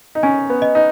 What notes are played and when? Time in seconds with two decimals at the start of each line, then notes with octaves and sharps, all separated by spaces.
0.15 D#4
0.23 C#4 G#5
0.50 B3
0.62 D#5
0.75 D#4